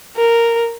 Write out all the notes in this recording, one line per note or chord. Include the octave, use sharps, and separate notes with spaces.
A#4